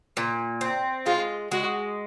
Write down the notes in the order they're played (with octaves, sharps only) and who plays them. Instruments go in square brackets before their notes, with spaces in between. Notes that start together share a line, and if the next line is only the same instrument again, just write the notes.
[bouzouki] A#2
C4
[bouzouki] G#3 [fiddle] F4
[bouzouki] G#3 [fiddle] F#4